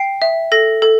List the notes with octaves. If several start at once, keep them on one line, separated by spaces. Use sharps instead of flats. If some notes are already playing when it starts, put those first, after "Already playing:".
Already playing: G5 C7
E5
A4 A#6
A4